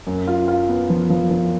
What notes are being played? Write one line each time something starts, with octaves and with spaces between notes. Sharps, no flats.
F#2
F4
F4
B3
F3
F3
F3